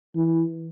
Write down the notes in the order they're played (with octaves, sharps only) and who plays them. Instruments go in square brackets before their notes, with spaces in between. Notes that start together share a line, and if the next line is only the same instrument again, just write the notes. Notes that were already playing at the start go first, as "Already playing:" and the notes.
[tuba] E3